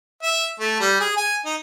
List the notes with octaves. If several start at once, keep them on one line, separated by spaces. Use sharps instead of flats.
E5
A3
G3
G#4
G#5
D#4